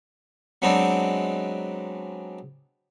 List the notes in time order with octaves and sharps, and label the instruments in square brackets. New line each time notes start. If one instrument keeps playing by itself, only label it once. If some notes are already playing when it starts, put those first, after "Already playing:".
[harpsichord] F#3 G#3 B3 C4 D4 D#4